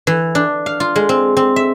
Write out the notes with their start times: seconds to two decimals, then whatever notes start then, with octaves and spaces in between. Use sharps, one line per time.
0.07 E3
0.35 D4
0.66 F5
0.80 F4
0.96 G#3
1.09 C4
1.37 C4
1.56 E5